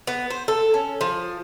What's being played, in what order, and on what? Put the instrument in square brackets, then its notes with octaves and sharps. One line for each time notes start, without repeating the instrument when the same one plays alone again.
[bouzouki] B3
C5
A4
C#4
F3